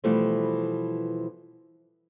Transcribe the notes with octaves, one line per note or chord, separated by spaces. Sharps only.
B2 E3 F3 G3 A3 B3